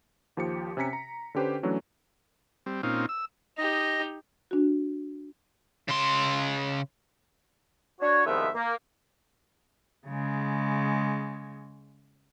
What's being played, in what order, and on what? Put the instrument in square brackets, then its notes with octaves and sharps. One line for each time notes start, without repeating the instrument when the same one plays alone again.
[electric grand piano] D#2 F3 G4 C#7
C3 C#4 G#5 A#5 B6 C#7
A#5
D3 C#4 G4 B4 C5
E3 F#3 A3 C#4 D4
[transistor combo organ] G3 C4
A#2 C4 C#4 D#4 F4
E6
[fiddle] D#4 G4 [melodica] D#5
[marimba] D4 F#4
[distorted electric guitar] C#3 C6
[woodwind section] D4 F#4 C#5
C2 G#2 D#3 F3 B3 E5
A#3
[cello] C#3 G#3